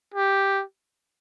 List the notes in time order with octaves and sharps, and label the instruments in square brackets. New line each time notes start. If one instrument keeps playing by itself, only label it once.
[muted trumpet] G4